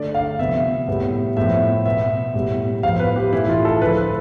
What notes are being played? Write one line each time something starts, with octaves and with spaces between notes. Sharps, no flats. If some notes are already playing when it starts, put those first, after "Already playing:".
Already playing: D3 A3 D5
F5
C3 F3 B3 E5
A2 G3 B3
A2 F3 B3 E5
B2 B3 E5
A2 G3 B3
A2 F3 B3 F5
B4
G4
A2 E3 A3 E4
F4
A4
D3 F3 A3 B4
B4